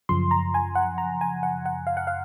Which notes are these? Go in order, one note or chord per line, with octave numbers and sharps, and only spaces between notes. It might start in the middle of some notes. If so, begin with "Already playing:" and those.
F#2 C#3 F3 C6
A#5
G#5
F#5
A#5
G#5
F#5
F#5
F5
F#5
F5